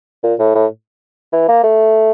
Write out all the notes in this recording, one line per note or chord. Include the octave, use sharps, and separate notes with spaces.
A#2
A2
A2
E3
A#3
A3